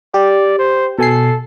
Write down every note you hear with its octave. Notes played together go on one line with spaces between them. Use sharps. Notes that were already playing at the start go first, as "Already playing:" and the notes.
G4 D5
C5
B2 A4 G#5 C7